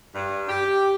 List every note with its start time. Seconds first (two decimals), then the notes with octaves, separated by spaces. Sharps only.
0.15 G2
0.49 G4